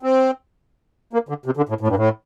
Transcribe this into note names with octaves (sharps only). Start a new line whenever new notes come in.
C4
A#3
D3
C3
D3
A2
A2
G2
A2